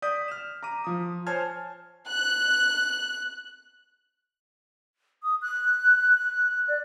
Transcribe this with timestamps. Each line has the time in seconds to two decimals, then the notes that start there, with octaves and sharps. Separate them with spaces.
0.02 D5 D#6 G6 B6
0.28 F6 E7
0.63 A#5 D6 D#7
0.84 F3 D#6
1.27 C5 C#5 G#5 A5 F6 G#6
2.08 F#6
5.23 D#6
5.42 F#6
6.68 D5